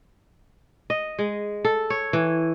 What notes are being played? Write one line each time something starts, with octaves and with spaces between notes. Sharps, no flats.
D#5
G#3
A4
C#5
E3